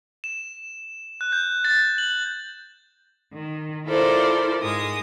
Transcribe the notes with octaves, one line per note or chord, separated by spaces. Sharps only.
E7
F#6
G6
A6
F#7
D#3
E4 F4 A4 A#4 C5 D5
G#2 G#3 D#6